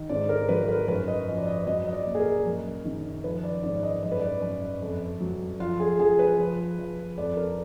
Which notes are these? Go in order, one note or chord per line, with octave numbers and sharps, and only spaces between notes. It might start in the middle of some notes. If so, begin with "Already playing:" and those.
Already playing: D#3
G#2 D5
A#4
F#3 B4
A#4
F#2 B4
D#5
F3
D5
D#5
F#3 D#5
D#5
D5
A#2
G#4
A#4
F#2
D#3
F3 B4
D5
G#2 D5
D5
D#5
F#2 D5
B4
D5
F#2
F2
F#3
F3 F4
G#4
F3 G#4
B4
F3
F3
F2 D5
A#4